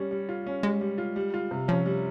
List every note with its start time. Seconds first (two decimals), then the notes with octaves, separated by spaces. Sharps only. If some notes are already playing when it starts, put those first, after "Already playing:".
Already playing: G3 C#4
0.11 G3
0.29 F4
0.46 C#4
0.63 G3 G#3
0.81 G3
0.98 F4
1.16 G3
1.34 F4
1.51 C3
1.68 F3 C#4
1.86 G3